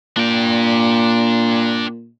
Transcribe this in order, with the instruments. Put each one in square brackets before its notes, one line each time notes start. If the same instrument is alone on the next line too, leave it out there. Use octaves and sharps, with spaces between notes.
[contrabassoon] A#2 [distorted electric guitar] D4 G5